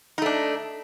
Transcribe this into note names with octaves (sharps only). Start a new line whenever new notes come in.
A3 D4 D#4